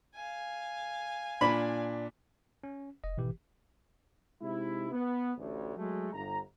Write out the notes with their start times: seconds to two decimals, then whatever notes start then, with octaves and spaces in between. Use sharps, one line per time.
0.15 F5 G#5
1.41 A#2 D4 B5
2.63 C#4
3.04 F1 D#5
3.17 G#1 B2 E3 G4
4.41 C3 G#3 D#4 E4
4.92 B3
5.38 A1 D2
5.77 F#3 G#3 A3
6.13 G1 A#5